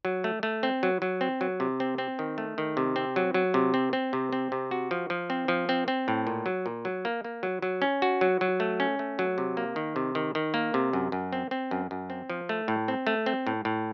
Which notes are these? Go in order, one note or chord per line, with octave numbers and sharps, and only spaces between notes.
F#3
A3
A3
C4
F#3
F#3
C4
F#3
C3
C4
C4
D#3
A3
D#3
C3
C4
F#3
F#3
C3
C4
C4
C3
C4
C3
F#4
F3
F3
C4
F3
C4
C4
A2
A#2
F#3
A#2
F#3
A#3
A#3
F#3
F#3
C#4
F#4
F#3
F#3
A3
C#4
A3
F#3
C3
A#3
D#3
C3
D#3
D#3
A#3
C3
F#2
F#2
C4
C4
F#2
F#2
C4
F3
A3
A2
C4
A3
C4
A2
A2